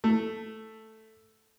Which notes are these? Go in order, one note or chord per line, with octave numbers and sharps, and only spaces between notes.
A3